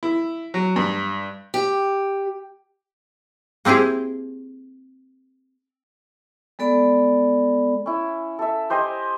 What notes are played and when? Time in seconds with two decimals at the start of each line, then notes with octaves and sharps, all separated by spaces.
0.03 E4
0.54 F#3
0.76 G2
1.54 G4
3.65 A#3 C4 E4 G4 G#4
6.59 G#3 B3 A4 D5 B5
7.86 C#4 E4
8.39 A4 E5
8.70 G4 C5 D#5 G#5